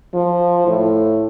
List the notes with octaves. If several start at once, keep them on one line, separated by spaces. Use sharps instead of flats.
F3
A2